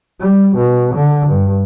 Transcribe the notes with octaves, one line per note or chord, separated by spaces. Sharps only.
G3
B2
D3
G2